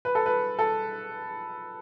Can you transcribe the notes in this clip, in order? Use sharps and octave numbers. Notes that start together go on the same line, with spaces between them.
B4
A4
B4
A4